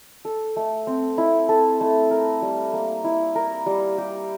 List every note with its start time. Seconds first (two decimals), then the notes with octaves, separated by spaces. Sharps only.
0.25 A4
0.56 A3
0.87 C4
1.18 E4
1.49 A4
1.81 A3
2.11 A#4
2.42 G3
2.73 A#3
3.04 E4
3.35 A#4
3.66 G3
3.98 G4